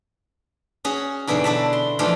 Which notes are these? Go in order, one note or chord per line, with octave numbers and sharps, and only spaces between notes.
C#4 F#4 G#4
G#2 B2 D3 E3 E4
D4 F#4 E5 A5
C6
E3 F3 G#3 A3 D4 F4